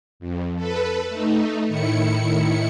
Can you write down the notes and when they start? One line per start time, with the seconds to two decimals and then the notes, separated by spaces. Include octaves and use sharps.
0.20 F2
0.56 A4 B4
1.09 A3 D#4
1.67 A2 D#3 E4 C#7